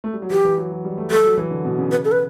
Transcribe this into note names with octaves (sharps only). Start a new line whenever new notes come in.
A3
G3
F#3
E3 G4
E3
F#3
F#3
G3
A3
G3 A4
F#3
E3
D3
B2
C#3
C#3 B4
A4
B4